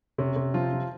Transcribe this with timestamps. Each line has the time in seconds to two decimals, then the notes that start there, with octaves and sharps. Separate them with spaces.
0.18 C3 C#4
0.36 C3
0.54 F3 F4
0.73 F3